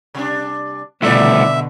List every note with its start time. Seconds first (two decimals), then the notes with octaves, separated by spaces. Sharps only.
0.15 C3 G3 D4
1.02 C2 B2 D3 A3 E4 D5 E5